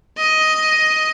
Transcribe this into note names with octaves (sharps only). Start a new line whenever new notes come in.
D#5